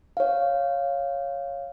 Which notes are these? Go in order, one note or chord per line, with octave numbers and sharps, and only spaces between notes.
C#5 F5